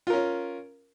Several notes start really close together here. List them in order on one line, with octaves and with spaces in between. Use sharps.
F4 A#4 C#4